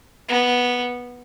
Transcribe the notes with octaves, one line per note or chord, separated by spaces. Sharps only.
B3